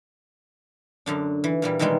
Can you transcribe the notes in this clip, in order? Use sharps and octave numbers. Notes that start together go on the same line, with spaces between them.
F#2 D3 D4
E3
A#2 E3 G3
B2 D#3 E3 G3 G#3